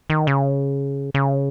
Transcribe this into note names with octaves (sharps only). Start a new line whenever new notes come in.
D#3
C#3
C#3